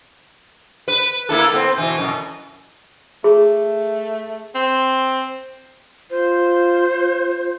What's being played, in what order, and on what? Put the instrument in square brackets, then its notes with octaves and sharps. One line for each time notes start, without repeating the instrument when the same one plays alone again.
[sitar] B4
A#3 E4 A4
B3 C4
B2 E3
F#2 B2
[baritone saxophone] A3 [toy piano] G#4
[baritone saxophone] C4
[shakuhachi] F4 [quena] C5